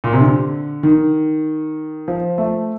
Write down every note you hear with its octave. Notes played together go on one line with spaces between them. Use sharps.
A#2
C3
D3
D#3
F3
A3